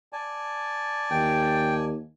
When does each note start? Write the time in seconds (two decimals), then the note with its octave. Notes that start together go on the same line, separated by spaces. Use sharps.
0.13 D5 G#5 A5
1.11 D#2 G5